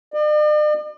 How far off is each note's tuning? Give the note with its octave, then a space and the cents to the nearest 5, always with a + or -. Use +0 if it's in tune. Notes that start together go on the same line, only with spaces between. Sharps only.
D5 +45